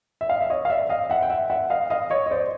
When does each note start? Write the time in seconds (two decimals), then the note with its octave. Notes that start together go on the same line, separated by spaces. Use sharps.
0.21 E5
0.29 D#5 F5
0.41 E5
0.50 C#5 D#5
0.65 F5
0.69 D5 E5
0.89 D#5 F5
1.10 E5 F#5
1.22 G5
1.30 E5 F#5
1.50 E5 F#5
1.70 D#5 F5
1.90 D#5 F5
2.10 C#5 D#5
2.26 D#5
2.31 C5 D5